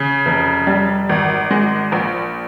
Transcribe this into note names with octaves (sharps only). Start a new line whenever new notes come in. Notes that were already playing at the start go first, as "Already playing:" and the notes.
Already playing: C#3
F1
G3
G#1
G#3
A#1